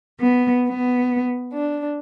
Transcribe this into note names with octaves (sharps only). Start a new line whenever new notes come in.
B3
B3
D4